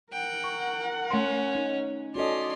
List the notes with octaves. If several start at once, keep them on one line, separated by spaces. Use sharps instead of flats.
A#4 F#5 G5
C#6
A3 C#4 C6
D#4
C#4 F#4 A4 D5 D#5 C6